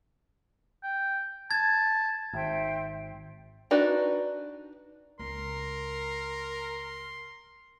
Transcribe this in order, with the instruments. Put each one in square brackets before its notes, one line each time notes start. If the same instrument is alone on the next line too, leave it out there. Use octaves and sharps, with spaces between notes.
[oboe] G5
[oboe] A5 [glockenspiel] G#6
[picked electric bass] G#1 [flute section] C5 E5 G5
[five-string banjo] D4 D#4 F#4 B4
[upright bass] C#2 [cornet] A#4 [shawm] C6